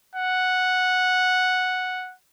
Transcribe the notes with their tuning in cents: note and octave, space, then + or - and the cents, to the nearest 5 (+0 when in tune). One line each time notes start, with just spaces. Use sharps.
F#5 -5